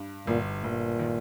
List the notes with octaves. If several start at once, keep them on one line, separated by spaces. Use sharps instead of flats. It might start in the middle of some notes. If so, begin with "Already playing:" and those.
Already playing: G2
G1 A#2
G1 A#2
D#3